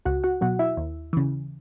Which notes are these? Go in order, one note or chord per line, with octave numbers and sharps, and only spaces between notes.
C#2 F#4 F#5
F#4 F#5
B2 F#3 F#4 F#5
E4 E5
D#2
C#3 E3